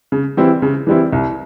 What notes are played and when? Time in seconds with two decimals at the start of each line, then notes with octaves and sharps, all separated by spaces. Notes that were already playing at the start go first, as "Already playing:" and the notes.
0.12 C#3
0.37 E3 G3 C4 E4
0.62 C#3
0.87 E3 G3 C4 E4
1.13 C2